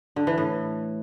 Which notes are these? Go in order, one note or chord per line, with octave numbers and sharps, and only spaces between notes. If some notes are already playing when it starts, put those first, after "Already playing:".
D3
E3
A2